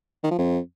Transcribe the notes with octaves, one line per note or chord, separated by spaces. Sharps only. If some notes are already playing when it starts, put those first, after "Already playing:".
D#3
F3
F2